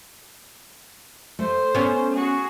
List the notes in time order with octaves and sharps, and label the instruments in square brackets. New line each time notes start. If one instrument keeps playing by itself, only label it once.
[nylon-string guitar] A3 [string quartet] C5
[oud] B3 C#4
[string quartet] F#4 G#4